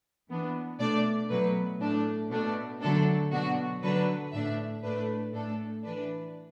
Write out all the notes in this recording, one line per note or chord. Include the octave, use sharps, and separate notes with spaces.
E3 B3 D4
B2 A3 D4 D5
B2 F#3 A3 B4
A2 A3 D4
B2 A3 D4
D3 F#3 A3 D4 A4
B2 F#3 D4 F#4
D3 F#3 D4 B4
A2 A3 D4 E5
A2 A3 D4 B4
A2 A3 D4 A4
E3 D4 B4